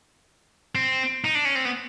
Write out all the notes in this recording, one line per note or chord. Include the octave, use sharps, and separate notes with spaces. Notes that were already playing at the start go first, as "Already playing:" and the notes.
C4
D#4
D4
C#4
C4
B3